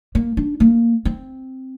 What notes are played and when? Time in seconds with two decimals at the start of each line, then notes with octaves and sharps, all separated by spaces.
0.15 A#3
0.37 D4
0.60 A#3
1.05 C4